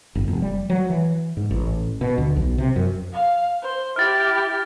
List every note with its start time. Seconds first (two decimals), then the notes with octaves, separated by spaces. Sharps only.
0.15 G1
0.28 F1
0.42 G3
0.70 F#3
0.90 E3
1.37 G#2
1.51 A1
2.01 B2
2.18 D2
2.36 B1
2.58 C3
2.76 F#2
3.13 F5
3.63 C5
3.96 E4 G4 F6 A6